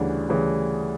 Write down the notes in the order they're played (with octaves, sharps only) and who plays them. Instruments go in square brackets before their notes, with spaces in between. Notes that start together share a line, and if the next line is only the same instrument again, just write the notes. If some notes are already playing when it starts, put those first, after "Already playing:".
Already playing: [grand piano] D2 C#3 E3 G3 D4
D2 C#3 E3 G3